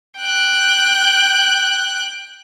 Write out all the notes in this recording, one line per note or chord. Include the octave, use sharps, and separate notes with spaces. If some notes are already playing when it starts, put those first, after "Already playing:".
G5 F#6